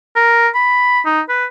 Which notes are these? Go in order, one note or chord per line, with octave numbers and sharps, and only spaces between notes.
A#4
B5
D#4
B4